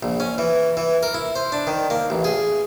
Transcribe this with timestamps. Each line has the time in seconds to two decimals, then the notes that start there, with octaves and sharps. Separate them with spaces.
0.03 A#1
0.20 C#4
0.38 E3
0.77 E3
1.03 A#4
1.14 E4
1.35 C5
1.52 D4
1.67 D#3
1.90 A#3
2.10 A1
2.24 G#4